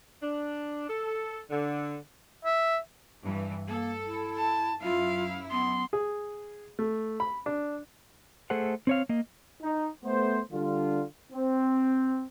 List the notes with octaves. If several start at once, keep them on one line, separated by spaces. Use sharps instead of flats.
D4
A4
D3
E5
G2 E3
A#3 A4
E4
A5
F#2 E4 F4 F5
B3 C6
G#4
A3
B5
D4
A3 G#4 A4 C5 F#5
C4 C#5 F5
A#3 D#5
D#4
A3 B3 C5
D3 G3 D4 F4
C4